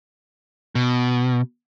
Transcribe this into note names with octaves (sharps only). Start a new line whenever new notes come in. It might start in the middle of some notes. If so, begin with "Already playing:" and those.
B2